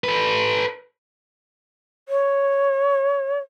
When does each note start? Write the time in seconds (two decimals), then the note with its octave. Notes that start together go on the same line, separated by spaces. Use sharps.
0.04 A4 B4
2.09 C#5